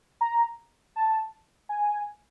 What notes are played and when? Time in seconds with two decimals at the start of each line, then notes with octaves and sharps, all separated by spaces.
0.21 A#5
0.96 A5
1.69 G#5